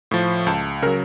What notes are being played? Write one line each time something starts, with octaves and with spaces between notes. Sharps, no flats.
A2 F3
C#2 A5
C#3 F#3 A#4